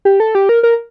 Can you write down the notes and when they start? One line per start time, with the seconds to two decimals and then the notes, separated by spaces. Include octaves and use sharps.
0.05 G4
0.20 A4
0.35 G4
0.49 A#4
0.63 A#4